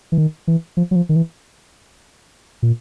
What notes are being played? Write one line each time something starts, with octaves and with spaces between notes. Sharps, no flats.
E3
D#3
E3
F3
F#3
F3
D#3
E3
A#2